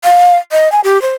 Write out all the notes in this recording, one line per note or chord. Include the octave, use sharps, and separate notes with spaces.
F5
D#5
G#5
G4
C5